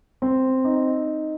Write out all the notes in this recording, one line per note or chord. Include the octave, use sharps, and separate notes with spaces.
C4
D#4